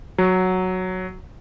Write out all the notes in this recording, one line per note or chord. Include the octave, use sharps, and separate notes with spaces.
F#3